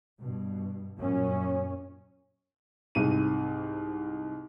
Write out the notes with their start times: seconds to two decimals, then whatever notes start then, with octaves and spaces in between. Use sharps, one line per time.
0.19 G2 B2
0.98 F#2 A#2 C#4
2.95 C2 G#2 D#7